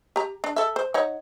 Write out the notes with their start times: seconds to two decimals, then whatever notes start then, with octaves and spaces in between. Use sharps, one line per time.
0.16 G4 A#5
0.44 D4
0.56 A4 E5
0.76 C5
0.94 D#4 C#5 F#5